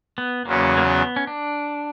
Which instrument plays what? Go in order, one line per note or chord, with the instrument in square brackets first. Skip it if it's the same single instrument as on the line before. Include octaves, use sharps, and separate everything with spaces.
[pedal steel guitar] B3
[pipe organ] E2 C#3 F#3 C#4 [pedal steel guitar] A#3
[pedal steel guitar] A#3
B3
C#4
D4